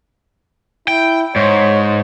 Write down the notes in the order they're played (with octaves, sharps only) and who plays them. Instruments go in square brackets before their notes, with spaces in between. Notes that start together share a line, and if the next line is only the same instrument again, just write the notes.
[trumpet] E4 [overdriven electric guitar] G5
[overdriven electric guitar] G#2 [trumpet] C#5